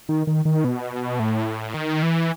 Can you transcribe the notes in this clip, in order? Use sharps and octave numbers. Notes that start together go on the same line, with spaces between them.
D#3
D#3
D#3
B2
A2
D#3
E3